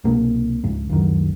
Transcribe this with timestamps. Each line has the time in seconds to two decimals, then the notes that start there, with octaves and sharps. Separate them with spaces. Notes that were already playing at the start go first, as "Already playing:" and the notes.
0.04 C2 B2 A#3
0.64 C#2 G#2
0.89 C#2 F#2 D#3